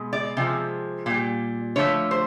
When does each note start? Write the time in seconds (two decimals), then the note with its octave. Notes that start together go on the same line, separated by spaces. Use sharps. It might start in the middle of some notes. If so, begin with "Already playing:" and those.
Already playing: B2 G#3
0.13 D5
0.37 C3 F3 G#3
1.06 A#2 G3
1.76 D3 F3 A3 C#5
2.11 C5